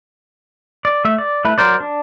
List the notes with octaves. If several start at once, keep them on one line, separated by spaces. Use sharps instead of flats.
D5
A3 E5
D5
A3 E4 B4
F#3 A#4 C5 D5
D4